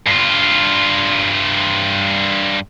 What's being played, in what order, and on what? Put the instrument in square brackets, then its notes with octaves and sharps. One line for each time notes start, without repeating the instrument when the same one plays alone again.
[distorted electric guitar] G2 F4